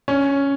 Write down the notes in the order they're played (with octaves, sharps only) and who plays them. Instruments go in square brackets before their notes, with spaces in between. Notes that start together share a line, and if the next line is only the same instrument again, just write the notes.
[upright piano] C#4